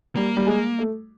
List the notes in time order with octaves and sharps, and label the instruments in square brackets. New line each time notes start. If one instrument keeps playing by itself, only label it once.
[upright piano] G3 [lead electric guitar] A#3
[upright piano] G3
G#3
A3